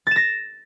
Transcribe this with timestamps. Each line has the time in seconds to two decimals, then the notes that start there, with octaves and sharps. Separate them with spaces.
0.07 A6
0.11 E7
0.16 A#6